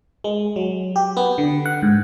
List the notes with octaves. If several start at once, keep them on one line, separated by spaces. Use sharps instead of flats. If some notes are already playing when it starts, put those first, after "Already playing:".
G#3
F#3
G4
B3
D3
F#5
G#2